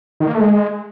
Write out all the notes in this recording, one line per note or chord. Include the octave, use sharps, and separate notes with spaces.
D#3
A#3
A3
G#3